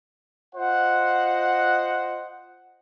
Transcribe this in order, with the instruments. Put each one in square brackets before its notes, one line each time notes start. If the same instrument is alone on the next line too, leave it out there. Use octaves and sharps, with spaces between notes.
[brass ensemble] F4 C5 D#5 F#5